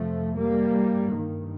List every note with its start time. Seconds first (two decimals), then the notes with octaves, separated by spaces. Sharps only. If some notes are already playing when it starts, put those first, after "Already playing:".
Already playing: F2 C3 F3 A3
0.35 G3 A#3
0.75 G2
1.13 D#3